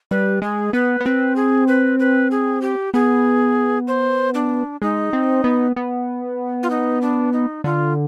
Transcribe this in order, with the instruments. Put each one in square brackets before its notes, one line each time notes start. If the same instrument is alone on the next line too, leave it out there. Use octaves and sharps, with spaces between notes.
[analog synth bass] G3 [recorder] B4
[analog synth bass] G#3 [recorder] G#4
[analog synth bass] B3 [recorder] B4
[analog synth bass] B3
[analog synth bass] C4 [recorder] B4
[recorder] G#4
B4
B4
G#4
G4
[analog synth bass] B3 [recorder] G#4
[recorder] C5
D4
[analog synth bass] G#3 [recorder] D#4
[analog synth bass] C4
B3
B3
[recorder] F4
D#4
D4
D#4
[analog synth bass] D3 [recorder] F4